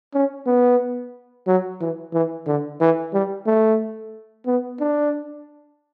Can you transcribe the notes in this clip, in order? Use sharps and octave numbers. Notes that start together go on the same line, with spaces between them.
C#4
B3
F#3
E3
E3
D3
E3
G3
A3
B3
D4